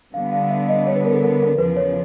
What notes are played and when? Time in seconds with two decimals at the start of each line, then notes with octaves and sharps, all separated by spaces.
0.14 D3 G3 B3 F5
0.33 F5
0.50 E5
0.68 D#5
0.87 C#5
0.96 B4
1.05 A#4
1.13 A4
1.22 A#4
1.40 A#4
1.58 E2 C#3 F3 B4
1.77 C#5